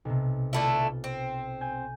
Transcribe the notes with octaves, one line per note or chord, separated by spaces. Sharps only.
B1 C3
D3 A3 E4 F4 A6
C4
G#5 G6 D#7